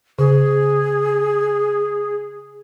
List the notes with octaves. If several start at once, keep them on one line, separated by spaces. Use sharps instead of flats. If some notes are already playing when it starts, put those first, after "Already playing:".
C#3 G#4